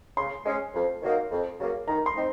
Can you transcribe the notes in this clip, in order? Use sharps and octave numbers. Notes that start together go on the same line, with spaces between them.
C#3 C6
G#3 C#4
F2
D#3 F#3 A#3 D#4
F2
C#3 F#3 A#3 C#4
D#3 A#5
C6
C4 D#4